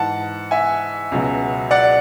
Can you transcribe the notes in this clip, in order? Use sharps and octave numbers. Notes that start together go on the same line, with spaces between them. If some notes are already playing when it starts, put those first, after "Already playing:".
Already playing: G#2 E3 F#5 A5
E5 G#5
C#2 B2 F#3
D5 F#5